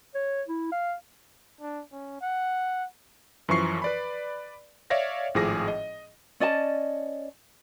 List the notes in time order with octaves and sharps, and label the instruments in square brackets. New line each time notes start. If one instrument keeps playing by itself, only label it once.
[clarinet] C#5
E4
F5
[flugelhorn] D4
C#4
F#5
[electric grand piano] F#2 E3 F3 C#6 C7
B4 D5 B5
C#5 D5 E5 F5 A#6
G#1 A2 F3 G#4 D6 A#6
D#5
[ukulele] C#4 D5 D#5 A5